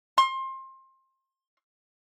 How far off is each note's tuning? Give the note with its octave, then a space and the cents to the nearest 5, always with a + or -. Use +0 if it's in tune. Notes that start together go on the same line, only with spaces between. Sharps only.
C6 +25